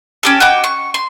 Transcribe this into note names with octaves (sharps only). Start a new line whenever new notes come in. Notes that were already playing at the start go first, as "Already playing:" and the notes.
C#4 G4 A4
F#4 D#5 G5 D6
C#6
C6